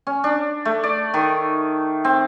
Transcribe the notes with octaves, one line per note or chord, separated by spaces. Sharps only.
C#4
D4
A3
D5
D#3
C4